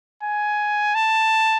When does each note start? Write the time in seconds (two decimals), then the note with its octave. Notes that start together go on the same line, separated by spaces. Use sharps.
0.23 G#5
0.95 A5